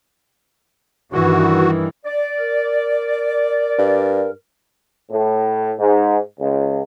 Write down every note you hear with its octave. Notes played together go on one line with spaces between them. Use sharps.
G2 D#3 E3 F#4
D5
A#4
G2
A2
G#2
C#2